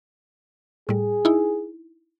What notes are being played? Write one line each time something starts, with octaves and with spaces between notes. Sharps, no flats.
A2 G3 G#4
D#4 E4